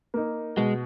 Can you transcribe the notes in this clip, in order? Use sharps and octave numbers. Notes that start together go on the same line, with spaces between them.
A#3 D#4
B2 G#3